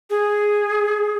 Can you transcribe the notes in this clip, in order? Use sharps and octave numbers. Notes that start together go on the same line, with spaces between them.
G#4